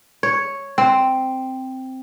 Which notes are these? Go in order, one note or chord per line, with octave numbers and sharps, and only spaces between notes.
C#5
C4